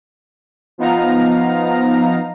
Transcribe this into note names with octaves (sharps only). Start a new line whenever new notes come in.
F3 B3 D#4 F5 A#5